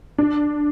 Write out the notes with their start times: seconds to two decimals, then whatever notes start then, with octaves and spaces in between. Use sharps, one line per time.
0.18 D4